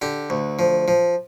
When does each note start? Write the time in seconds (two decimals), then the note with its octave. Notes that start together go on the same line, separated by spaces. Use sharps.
0.02 D3 G4
0.30 D2
0.59 F3
0.88 F3